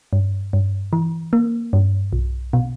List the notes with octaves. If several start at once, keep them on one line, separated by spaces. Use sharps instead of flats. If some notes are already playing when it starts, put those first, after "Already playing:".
G2
G2
E3
A#3
G2
B1
B2